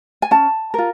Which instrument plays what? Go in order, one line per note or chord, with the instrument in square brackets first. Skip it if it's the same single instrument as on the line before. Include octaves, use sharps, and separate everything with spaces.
[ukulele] G#5
C#4 A5
F4 A#4